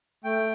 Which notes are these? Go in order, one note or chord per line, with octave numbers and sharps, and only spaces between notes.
A3 G5